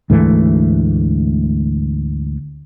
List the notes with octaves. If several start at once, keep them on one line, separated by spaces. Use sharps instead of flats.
D2 G#2 E3 A3